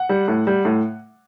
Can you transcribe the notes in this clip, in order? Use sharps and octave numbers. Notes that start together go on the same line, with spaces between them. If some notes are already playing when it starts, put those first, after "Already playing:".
Already playing: F#5
G3
A2
G3
A2